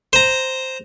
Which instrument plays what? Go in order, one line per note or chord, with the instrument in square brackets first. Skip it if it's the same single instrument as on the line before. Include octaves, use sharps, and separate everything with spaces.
[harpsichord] C5 A#5